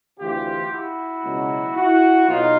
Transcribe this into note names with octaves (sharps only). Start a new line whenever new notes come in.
D2 C3 E3 F4 G4
E4 F#4
C#2 B2 F#3
E4 F#4
B1 D#4 F4